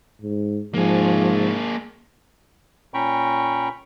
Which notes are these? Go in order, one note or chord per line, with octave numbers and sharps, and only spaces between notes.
G#2
G#2 F3 A#3 G#4
A#2 C#4 G5 A#5 B5 C#6